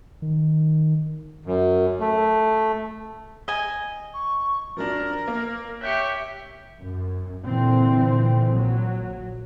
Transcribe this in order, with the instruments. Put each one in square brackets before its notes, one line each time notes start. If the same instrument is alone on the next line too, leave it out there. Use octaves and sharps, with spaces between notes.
[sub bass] D#3
[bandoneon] F#2
A3
[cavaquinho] D#5 G#5
[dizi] C#6
[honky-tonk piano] F3 F#3 D4 [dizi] A#4
[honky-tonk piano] A#3
[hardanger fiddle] G4 E5 [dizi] C#5 [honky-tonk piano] F#6 G6 C#7
[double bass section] F#2
A#2 D3 E3 C4
A#1 F#3